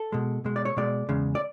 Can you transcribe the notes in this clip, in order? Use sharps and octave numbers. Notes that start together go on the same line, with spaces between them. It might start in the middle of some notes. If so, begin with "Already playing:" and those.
Already playing: A4
B2 G#3
B2 G#3
D5
C#5
B2 G#3 D5
E2 C#3 G#3
D5